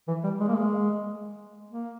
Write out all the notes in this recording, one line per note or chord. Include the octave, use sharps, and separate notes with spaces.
E3
G3
G#3
A#3
G#3
A#3